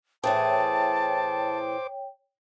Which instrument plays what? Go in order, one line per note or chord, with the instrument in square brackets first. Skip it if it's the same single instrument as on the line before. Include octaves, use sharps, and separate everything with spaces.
[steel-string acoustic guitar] A2 E3 G#4 [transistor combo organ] C5 D6 [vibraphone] C#5 G5 [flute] A5